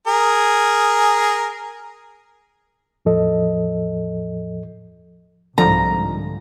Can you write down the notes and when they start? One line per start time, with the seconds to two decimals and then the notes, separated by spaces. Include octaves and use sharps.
0.07 G#4 A#4
3.05 E2 A2 F3 A4 D#5
5.58 C2 G#2 D3 F3 A#5